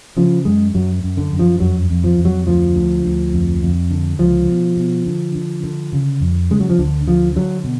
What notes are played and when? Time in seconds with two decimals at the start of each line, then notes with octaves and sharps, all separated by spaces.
0.17 C#3 F3
0.45 F#2 G#3
0.74 F#2 F#3
1.03 F#2
1.17 D3
1.32 F#2
1.39 F3
1.60 F2 F#3
1.90 F2
2.04 F3
2.18 F2
2.25 F#3
2.46 D2 F3
2.75 D2
3.05 D2
3.33 F2
3.62 F2
3.91 D3
4.19 C#2 F3
4.49 B2
4.77 B2
5.06 D3
5.35 D3
5.63 D3
5.93 C#3
6.21 F2
6.50 C#3 G#3
6.60 F#3
6.70 F3
6.79 D2 D3
7.07 D3 F3
7.35 D3 F#3
7.64 B2